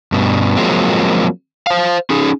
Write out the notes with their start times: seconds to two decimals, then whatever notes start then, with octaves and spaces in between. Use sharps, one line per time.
0.12 G2 B2
0.56 F3 F#3 G#3 A#3 C4
1.67 C5 F5
2.10 C#4 D#4 G#4